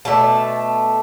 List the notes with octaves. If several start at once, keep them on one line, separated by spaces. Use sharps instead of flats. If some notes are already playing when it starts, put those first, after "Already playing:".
B2 A3 D4 A5